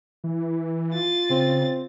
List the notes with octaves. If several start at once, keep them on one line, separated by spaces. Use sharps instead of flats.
E3
F4 A6
C#3 C4